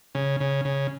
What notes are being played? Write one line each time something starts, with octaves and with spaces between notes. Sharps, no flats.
C#3
C#3
C#3